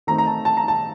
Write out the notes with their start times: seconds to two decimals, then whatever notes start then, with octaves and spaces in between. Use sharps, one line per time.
0.07 D#3 A3 C4 D#4 A#5
0.18 A#5
0.27 A5
0.45 A5
0.57 A#5
0.68 A5